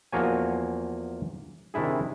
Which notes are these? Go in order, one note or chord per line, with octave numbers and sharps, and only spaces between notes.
E2 F3 A#3 F#4 C#5 G#5
C3 D#3 D4 E4 G#4